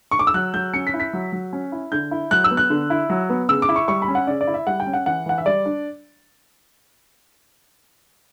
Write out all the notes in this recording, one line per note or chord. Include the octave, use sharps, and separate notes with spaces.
C#6
D6
E6
F#3 F#6
F#3 G6
C#4 C#7
B6
E4
B6
F#3
F#3
C#4
E4
D3 G6
E4
F#3 F#6
E6
B3
F#6
D3
E4
F#3
B3
C#3 E6
D6
E4
C#6
G3 C#6
B5
C#4
F#5
C#3 D5
D5
E4
E5
G3 F#5
G5
C#4
F#5
E3 F#5
E3 F#5
E5
G3 D5
D4